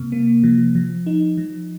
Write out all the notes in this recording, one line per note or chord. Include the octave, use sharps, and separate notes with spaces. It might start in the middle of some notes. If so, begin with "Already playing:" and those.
Already playing: C3 A#3
A#3
F3
F3
D#4
F3